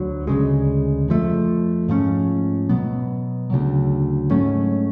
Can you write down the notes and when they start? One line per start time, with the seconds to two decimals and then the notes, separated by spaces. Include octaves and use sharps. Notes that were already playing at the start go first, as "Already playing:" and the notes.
Already playing: D2 D3 F#3
0.27 D2 C#3 G#3
1.08 F2 F3 A3
1.88 G#2 F3 A3 C#4
2.69 B2 F#3 B3
3.50 D2 C#3 F#3
4.31 G#2 F#3 A3 C#4